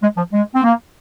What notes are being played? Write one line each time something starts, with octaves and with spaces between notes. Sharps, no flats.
G#3
F3
G#3
C4
A#3